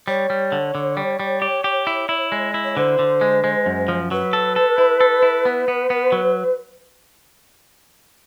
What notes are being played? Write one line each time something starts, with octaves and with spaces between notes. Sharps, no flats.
G3 C#5
G3
D3
D3
G3
G3
G4
G4
E4
E4
G#3
E4
C#5
D3 C5
D3
G#3
G#3
F#2
F3
F#3 B4
A4
A4
E4
A4
E4
B3
B3
B3
F#3